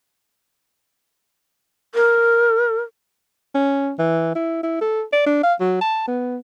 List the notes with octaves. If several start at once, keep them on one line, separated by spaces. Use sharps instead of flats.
A#4
C#4
E3
E4
E4
A4
D5
D4
F5
F#3
A5
B3